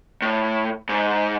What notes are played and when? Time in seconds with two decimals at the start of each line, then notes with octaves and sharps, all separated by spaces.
0.22 A2
0.89 G#2